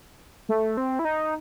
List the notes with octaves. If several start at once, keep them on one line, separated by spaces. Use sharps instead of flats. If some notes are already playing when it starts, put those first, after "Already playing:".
A3
C4
E4
D#4